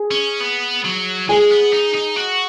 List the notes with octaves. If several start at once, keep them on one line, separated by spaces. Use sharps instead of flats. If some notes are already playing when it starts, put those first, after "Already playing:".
Already playing: G#4
C#4
B3
F#3
G#3 G#4
B3
D#4
D#4
F#4